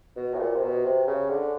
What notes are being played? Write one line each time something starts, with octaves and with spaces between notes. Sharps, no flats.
B2
A2
A#2
C3
B2
C3
C#3
D3